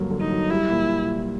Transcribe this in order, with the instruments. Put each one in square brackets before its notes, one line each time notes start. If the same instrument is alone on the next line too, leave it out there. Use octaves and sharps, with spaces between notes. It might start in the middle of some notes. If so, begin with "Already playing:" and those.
Already playing: [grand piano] G2 D3 F#3 A#3
D3
[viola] D#4
[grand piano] F#3
[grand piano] G3 [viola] E4
[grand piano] A#2